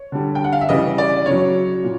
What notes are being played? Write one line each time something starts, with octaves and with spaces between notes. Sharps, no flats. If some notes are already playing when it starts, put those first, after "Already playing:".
Already playing: C#5
D3 G3
G5
F#5
F5
E5
C#3 E3 G3 D#5
D5
C#3 C#5
F#3
A#2